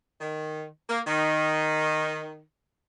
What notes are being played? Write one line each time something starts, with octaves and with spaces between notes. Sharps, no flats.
D#3
A#3
D#3